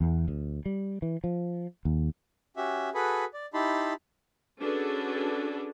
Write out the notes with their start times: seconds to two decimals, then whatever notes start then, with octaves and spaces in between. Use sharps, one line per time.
0.01 E2
0.28 D2
0.66 G3
1.02 E3
1.24 F3
1.85 D#2
2.57 C#4 F#4 G4 E5
2.94 F#4 G#4 A4 B4 B5
3.34 D5
3.54 D#4 E4 G4 A5 B5 C6
4.59 C#4 D4 F#4 G#4 A4 B4